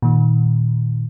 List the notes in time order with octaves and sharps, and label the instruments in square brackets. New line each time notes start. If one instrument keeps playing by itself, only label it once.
[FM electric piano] A#2 D#3